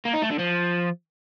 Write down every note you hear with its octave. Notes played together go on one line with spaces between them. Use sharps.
A#3
D#4
A3
D3
F3